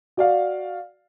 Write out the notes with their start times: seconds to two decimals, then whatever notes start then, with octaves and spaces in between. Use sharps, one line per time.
0.17 F#4 D5 F5